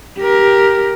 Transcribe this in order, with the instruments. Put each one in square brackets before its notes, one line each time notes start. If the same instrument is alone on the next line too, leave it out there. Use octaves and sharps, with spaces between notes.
[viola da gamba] G4 A#4